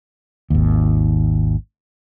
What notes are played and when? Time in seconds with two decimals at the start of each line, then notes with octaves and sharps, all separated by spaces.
0.50 G#1 D#2